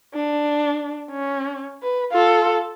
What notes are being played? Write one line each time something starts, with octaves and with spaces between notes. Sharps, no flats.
D4
C#4
B4
F4 A4